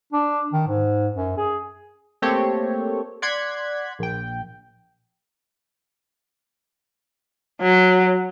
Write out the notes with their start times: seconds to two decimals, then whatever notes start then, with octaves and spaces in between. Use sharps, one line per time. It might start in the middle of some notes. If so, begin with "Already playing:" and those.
0.13 D4
0.53 D#3
0.67 G#2
1.13 F#2
1.37 G#4
2.22 A3 A#3 C4 G4 A4 C#5
3.22 D5 F#5 C6 F#6 G#6 B6
3.99 A#1 G5
7.61 F#3